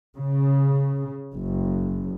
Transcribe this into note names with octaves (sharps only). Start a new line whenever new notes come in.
C#3
F#1